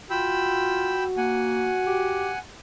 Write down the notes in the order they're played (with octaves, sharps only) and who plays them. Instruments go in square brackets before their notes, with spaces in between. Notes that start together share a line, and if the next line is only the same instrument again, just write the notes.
[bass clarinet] F4 [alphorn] F#4 [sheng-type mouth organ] G5 B5 E6
[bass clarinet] A#3 [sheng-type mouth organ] F#5 G#5
[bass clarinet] G4